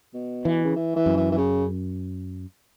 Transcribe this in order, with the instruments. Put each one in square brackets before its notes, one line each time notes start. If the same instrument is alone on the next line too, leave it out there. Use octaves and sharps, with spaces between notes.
[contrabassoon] B2
[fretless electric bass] E3
[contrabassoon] C#3
E3
E3
[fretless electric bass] F#2
[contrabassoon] E3
E3
C#3